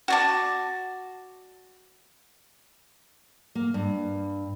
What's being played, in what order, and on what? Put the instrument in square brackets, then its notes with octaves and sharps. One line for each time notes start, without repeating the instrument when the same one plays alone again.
[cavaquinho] F#4 D5 A5
[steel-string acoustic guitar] A#3
G2